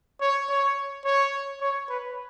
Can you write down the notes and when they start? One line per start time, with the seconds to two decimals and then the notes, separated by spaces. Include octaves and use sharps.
0.21 C#5
0.50 C#5
1.05 C#5
1.61 C#5
1.89 B4